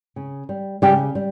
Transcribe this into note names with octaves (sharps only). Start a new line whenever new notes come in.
C#3
G3
C#3 G3 G4
G3